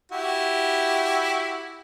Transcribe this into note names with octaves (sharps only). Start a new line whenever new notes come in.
E4 F#4 G4